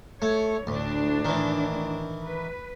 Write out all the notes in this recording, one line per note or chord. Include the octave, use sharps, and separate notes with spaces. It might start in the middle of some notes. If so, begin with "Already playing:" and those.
A3 C#5
D2 A2 D4
D#3 E3
B4